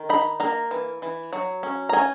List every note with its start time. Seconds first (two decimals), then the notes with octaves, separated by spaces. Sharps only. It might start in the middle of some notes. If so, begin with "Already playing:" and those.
Already playing: D#3
0.09 D#4 B5
0.40 A#3 A#5
0.71 E3
1.02 E3
1.33 F#3
1.63 C#4
1.89 A#5
1.93 C#4 G#5